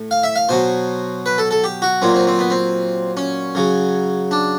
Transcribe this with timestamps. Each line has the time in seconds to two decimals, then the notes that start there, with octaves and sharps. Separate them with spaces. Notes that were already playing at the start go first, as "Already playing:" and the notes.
Already playing: A2
0.11 F5
0.23 E5
0.36 F5
0.49 B2 F#3 C5
1.26 B4
1.38 A4
1.51 A4
1.64 G4
1.82 F#4
2.02 A#2 F#3 C4
2.14 C4
2.27 C4
2.39 B3
2.50 C4
3.17 C#4
3.55 C#3 F#3
4.31 D4